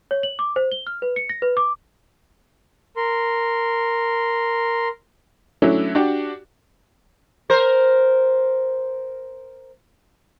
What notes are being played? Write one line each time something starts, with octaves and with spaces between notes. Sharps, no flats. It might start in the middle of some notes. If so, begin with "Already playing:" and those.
C#5
F#7
D6
C5
G7
F6
B4
C#7
A#6
B4
D6
A#4 C6
F#3 A3 C#4 D4 E4
D4 F#4 G4 D5
A#4 C5